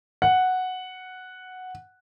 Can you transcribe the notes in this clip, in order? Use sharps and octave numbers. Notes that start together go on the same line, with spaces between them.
F#5